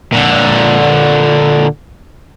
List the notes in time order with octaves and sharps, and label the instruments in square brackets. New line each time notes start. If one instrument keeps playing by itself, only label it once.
[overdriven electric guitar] A#2 D3